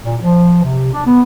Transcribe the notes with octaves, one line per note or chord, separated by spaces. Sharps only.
A#2
F3
C3
D4
B3